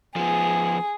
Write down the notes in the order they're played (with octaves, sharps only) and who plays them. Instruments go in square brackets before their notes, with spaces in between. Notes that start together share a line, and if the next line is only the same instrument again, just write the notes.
[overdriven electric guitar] F3 B3 [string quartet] G#4